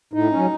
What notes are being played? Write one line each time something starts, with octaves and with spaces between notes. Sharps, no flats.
A2 D#4
F#3 C#4